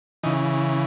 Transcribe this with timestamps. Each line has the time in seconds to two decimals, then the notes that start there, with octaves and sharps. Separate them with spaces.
0.23 C#3 E3 D#4